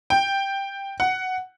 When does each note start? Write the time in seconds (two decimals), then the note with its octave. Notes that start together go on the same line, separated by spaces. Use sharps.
0.10 G5
1.00 F#5